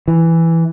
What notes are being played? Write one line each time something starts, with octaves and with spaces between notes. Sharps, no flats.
E3